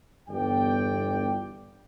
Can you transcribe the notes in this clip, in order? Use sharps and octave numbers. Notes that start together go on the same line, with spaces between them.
G1 E2 G2 D5 G5